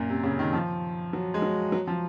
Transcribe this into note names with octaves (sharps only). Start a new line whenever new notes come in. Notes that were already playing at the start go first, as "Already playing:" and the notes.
Already playing: F#2 A#2
C3
C#3
D#3
F3
F#3
G#3
F#3
F#3
F3